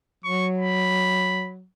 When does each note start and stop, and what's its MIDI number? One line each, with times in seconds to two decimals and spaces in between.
0.24 1.65 54
0.24 0.48 85
0.58 1.51 83